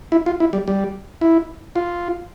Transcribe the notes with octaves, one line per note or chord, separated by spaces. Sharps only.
E4
F4
E4
G3
G3
E4
F4